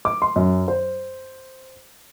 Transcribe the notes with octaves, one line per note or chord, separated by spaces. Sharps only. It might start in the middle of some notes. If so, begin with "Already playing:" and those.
D6
C6
F#2
C5